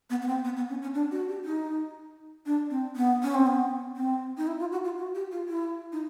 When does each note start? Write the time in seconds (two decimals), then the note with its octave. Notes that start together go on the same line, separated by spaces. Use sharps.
0.10 B3
0.22 B3
0.27 C4
0.44 B3
0.57 B3
0.69 C#4
0.82 C#4
0.94 D4
1.11 F#4
1.28 G4
1.44 D#4
2.46 D4
2.70 C4
2.96 B3
3.23 C#4
3.34 C4
3.47 B3
3.97 C4
4.38 D#4
4.47 E4
4.60 F4
4.72 F#4
4.85 F4
4.98 F#4
5.15 G4
5.32 F4
5.48 E4
5.92 D#4